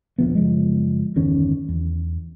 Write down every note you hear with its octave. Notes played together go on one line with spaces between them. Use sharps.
D#1 A#1 F3 B3
F#1 F3 G#3
G1 E2 D#3 C#4
E2